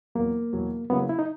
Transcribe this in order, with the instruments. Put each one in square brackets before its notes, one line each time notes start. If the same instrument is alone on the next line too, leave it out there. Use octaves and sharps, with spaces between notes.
[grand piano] E2 B2 F#3 [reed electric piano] A#3
[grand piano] E2 B2 F#3
[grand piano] C#3 F#3 A#3 C#4 E4 [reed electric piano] B3
[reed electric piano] E4
D#4